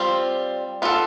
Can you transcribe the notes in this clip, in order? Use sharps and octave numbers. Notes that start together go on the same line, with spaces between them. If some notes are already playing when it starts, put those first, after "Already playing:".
Already playing: G3 C4 F4
B3 F4 A4